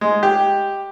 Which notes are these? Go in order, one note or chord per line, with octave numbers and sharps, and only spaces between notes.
G#3
G4